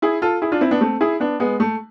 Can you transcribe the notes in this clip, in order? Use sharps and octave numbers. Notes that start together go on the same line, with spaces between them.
E4 G#4
F4 A4
E4 G#4
D4 F4
C4 E4
B3 D4
A3 C4
E4 G#4
B3 D4
G#3 B3
A3